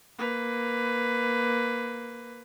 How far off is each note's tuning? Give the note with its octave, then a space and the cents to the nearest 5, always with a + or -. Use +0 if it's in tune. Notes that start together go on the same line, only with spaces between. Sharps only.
A#3 +10 B4 +15